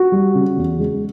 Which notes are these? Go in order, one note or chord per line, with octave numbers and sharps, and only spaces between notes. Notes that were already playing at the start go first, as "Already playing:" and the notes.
Already playing: F#4
G3
C#3
E2
G#3